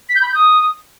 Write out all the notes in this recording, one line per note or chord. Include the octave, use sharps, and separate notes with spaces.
B6
G6
B5
G6
D#6